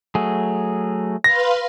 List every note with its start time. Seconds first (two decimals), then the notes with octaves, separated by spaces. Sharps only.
0.15 F#3 A3 G#4
1.24 B4 F5 C6 A#6